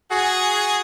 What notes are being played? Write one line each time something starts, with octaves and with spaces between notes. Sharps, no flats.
F#4 G#4